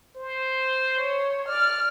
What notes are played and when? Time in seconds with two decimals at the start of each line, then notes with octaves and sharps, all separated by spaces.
0.17 C5
0.97 C#5
1.48 D5 F6